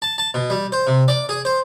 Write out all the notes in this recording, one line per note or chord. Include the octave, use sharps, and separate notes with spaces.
A5
A5
B2
G3
C5
C3
D5
G#4
C5